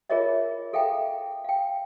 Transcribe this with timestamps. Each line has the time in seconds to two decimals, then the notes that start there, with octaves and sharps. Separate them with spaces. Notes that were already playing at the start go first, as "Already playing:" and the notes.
0.10 F4 G#4 A#4 C#5 D#5 E5
0.73 G#4 A4 E5 F5 G5 A#5
1.44 F5 G5